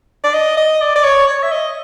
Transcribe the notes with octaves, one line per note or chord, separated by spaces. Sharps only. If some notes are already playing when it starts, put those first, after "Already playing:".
D5
D#5
D#5
D5
D5
C#5
C#5
E5
D#5